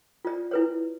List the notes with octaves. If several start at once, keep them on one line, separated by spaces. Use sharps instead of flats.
F4 D5
E4 B4 C#5